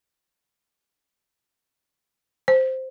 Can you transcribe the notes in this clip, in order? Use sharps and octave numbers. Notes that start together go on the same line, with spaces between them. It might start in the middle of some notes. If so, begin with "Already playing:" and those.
C5